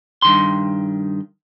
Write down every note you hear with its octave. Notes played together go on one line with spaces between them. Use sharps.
G2 D#3 C6